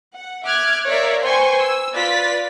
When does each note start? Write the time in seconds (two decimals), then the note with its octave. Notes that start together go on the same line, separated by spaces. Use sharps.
0.14 F#5
0.45 E5 D6 F6 F#6 G#6
0.87 A#4 C#5 D5 E5 F5
1.22 B4 C5 G5 G#5 C6 C#6
1.60 E6
1.95 F4 B4 D5 A6 B6